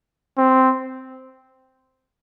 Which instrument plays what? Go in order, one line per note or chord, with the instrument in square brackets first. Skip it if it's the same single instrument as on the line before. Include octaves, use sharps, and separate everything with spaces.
[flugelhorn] C4